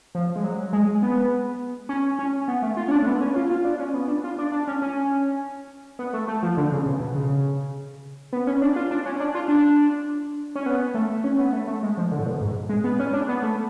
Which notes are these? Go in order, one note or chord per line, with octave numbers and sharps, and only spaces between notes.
F3
G#3
F#3
G#3
B3
C#4
C#4
B3
A3
F4
C#4
D4
A3
B3
C#4
F4
F4
D4
C#4
B3
D4
F4
D4
D4
C#4
C#4
B3
A3
A3
F3
D3
C#3
B2
B2
C#3
B3
C#4
D4
F4
D4
C#4
D4
F4
D4
C#4
B3
A3
C#4
B3
A3
A3
G#3
F3
D3
A2
B2
G#2
G#3
B3
C#4
D4
B3
A3